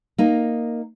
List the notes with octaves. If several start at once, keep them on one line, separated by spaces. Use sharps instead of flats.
A#3 D#4